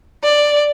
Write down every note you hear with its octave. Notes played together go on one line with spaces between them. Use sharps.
D5